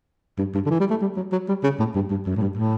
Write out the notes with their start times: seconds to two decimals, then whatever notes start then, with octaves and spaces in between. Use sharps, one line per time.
0.38 G2
0.54 G2
0.66 D3
0.70 E3
0.80 G3
0.90 A3
1.02 G3
1.17 F#3
1.32 F#3
1.48 G3
1.63 C#3
1.79 A2
1.95 G2
2.11 G2
2.26 F#2
2.36 A2
2.42 G2
2.57 A2